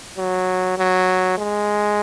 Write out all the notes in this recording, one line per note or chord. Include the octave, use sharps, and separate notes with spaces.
F#3
F#3
G#3